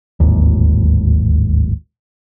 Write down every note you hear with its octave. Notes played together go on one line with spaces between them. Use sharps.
D1 G#1 D#2